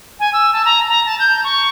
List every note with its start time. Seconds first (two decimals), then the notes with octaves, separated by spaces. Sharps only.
0.19 G#5
0.33 E6
0.53 A5
0.65 A#5
0.88 A#5
1.05 A5
1.19 G6
1.44 C#6